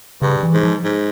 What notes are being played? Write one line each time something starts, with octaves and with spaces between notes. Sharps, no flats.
G2 C#3
E3
G#2
F3
G#2